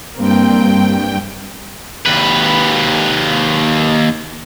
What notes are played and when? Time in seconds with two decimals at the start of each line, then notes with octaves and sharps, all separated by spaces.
0.17 G2 A#3 C4 G5
2.06 D#2 B4